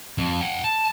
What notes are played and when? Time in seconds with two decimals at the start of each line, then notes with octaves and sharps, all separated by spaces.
0.18 F2
0.41 F#5 G5
0.64 A5